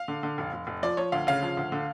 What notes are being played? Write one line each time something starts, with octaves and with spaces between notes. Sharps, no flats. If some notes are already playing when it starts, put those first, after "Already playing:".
Already playing: F5
D3
D3
F1
F1
F1
F3 D5
F3 C#5
D2 F5
C#3 F5
F3
D2
D3